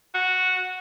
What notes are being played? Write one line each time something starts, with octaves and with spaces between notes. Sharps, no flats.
F#4